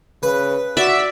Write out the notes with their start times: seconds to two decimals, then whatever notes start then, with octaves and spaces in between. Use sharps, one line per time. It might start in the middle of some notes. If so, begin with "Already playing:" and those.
0.23 C#3 B4
0.77 F#4 D5 E5